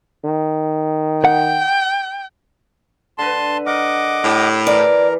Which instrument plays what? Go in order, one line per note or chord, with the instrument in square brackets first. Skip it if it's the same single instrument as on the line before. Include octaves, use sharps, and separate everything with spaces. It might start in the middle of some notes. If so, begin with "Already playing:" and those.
[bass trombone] D#3
[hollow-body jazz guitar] F#5 [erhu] G5
[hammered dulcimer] D3 B4 [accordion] A5 C6
[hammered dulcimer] A#4 [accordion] D#5 F#5 D6
[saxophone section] A2 [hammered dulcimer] G4 A5
[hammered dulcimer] E3 [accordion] A#4 [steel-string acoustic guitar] D5